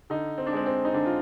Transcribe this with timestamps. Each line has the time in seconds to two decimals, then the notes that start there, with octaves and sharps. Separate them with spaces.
0.10 D3 D#4
0.38 C4
0.46 D4
0.53 G#3 C4
0.66 C4
0.85 D#4
0.93 D3 D4
1.06 F4